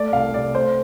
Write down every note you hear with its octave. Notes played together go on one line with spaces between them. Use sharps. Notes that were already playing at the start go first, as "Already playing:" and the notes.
Already playing: A3 D5
C2 F5
C3 D5
A3 C5